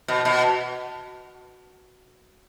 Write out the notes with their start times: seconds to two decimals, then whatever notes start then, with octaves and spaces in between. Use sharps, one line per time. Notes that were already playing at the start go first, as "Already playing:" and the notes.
0.08 B2
0.25 B2